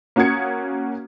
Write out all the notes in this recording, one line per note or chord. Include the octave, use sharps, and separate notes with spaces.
A#3 C#4 F#4 D#6 G#6 C#7